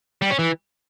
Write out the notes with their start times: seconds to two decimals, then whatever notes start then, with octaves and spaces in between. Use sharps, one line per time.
0.22 G3
0.30 C#4
0.39 E3